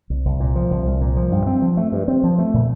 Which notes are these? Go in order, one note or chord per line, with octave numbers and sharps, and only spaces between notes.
C2
C2
A#2
F3
C2
C2
A#2
F3
G2
C4
F3
A3
G2
C4
F3
A3
A#2